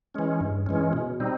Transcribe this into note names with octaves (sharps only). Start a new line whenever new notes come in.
E3 G#3 C#4
G2
E3 G#3 C#4
B2
G3 C4 D#4